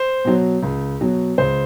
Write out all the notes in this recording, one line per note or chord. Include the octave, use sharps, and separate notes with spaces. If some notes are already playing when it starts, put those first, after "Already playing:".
Already playing: C5
B2 F#3
C#2
B2 F#3
C#2 C5